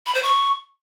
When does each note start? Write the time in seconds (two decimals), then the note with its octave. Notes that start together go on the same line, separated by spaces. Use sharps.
0.06 B5
0.15 C5
0.23 C#6